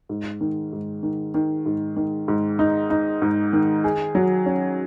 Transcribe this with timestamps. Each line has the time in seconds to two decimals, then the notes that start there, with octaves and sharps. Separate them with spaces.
0.09 G#2
0.41 D#3
0.73 G#2
1.03 D#3
1.34 D#3
1.66 G#2
1.97 D#3
2.28 G#2
2.59 D#4
2.90 D#4
3.22 G#2
3.53 D#3
3.84 G#4
4.15 F#3
4.46 C#4